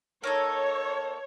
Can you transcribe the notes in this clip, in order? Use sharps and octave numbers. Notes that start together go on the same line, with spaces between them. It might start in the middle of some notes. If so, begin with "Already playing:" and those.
A#3 D#4 A4 C#5